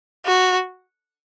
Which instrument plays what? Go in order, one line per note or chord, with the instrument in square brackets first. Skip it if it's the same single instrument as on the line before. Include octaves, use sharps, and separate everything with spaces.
[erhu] F#4